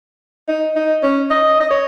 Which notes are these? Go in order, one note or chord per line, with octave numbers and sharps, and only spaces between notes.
D#4
D#4
C#4
D#5
D#5
C#5